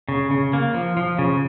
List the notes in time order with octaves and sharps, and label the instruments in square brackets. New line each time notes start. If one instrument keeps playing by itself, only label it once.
[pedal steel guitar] C#3
C#3
A#3
F3
F3
C#3